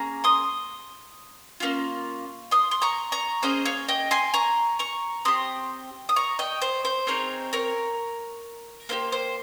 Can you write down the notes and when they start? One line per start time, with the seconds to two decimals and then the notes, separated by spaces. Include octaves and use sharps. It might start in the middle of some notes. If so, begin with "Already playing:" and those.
Already playing: A#3 C#4 G#4 A#5
0.24 C6 D#6
1.60 A#3 C#4 F4
2.51 C6 D#6
2.71 C6
2.82 A#5 C#6
3.12 A#5 C#6
3.42 A#3 C#4 G#4 C5 D#5
3.66 C#5 F5
3.88 D#5 G5
4.11 G#5 C6
4.34 A#5 C#6
4.79 A#5 C#6
5.25 C4 G4 C6 D#6
6.09 D#6
6.16 A#5 C#6
6.39 D#5 G5
6.62 C5
6.85 C5
7.07 C4 D#4 G#4 A#4 C#5
7.53 A#4 C#5
8.89 A#3 D#4 G4 C5
9.12 C5